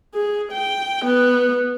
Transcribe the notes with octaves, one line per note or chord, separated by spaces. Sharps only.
G#4
G5
B3